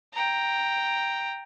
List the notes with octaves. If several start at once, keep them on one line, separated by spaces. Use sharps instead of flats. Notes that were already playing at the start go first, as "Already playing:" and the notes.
G5 A#5